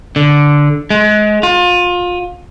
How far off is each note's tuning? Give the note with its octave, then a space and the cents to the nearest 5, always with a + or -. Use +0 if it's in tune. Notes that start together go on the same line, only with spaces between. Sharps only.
D3 -5
G#3 +25
F4 +30